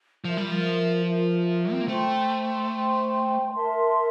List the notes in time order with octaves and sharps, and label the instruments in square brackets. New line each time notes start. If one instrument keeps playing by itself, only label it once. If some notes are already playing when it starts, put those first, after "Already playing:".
[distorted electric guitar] F3 [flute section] F4 A#4 E5
[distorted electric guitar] G3
F3
[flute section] F4 A#4 E5
[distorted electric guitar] C4
A#3
[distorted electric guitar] A3 [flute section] C5 G5 C6
[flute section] C5 G5 C6
A#4 E5 A5 C6